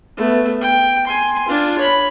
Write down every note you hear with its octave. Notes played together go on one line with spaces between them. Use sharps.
A3 B3
G5
G#5 C6
D4 F4
C#5 B5